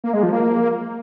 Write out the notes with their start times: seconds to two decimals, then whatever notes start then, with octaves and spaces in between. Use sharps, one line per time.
0.04 A#3
0.13 G#3
0.23 F3
0.33 A#3